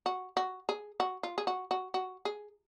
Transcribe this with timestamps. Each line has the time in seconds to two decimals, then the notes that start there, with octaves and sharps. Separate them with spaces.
0.06 F#4
0.37 F#4
0.69 G#4
1.00 F#4
1.23 F4
1.38 G#4
1.47 F#4
1.71 F#4
1.94 F#4
2.25 G#4